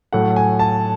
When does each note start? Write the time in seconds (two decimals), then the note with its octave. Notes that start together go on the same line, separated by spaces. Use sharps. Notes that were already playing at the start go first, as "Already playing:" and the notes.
0.13 A2 F#3 A3 F#5
0.36 G#5
0.59 A5